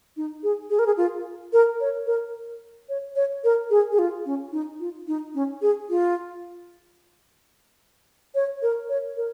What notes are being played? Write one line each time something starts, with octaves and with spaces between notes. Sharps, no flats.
D#4
G#4
G#4
A#4
G#4
F4
A#4
C#5
A#4
C#5
C#5
A#4
G#4
G#4
F4
C#4
D#4
F4
D#4
C#4
G#4
F4
C#5
A#4
C#5
A#4